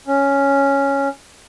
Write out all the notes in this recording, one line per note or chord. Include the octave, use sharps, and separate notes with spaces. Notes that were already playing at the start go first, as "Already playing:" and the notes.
C#4